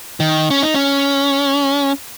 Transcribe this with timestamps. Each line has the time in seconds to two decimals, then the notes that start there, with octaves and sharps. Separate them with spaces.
0.20 D#3
0.50 C#4
0.62 D#4
0.74 C#4